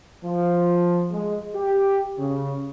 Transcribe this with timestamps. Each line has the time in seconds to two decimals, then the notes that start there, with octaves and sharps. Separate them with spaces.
0.24 F3
1.11 G#3
1.55 G4
2.18 C#3